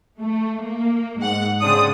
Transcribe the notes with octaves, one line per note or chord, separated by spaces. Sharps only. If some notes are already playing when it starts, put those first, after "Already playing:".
A3
A#3
G#2 F#5
C#3 G#3 C4 D4 D#6